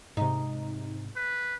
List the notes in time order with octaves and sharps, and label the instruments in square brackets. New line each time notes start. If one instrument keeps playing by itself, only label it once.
[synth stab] G#2 C3 [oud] D#4
[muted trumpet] B4